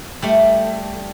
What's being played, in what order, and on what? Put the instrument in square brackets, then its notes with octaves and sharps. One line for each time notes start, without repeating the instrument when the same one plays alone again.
[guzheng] G3 A3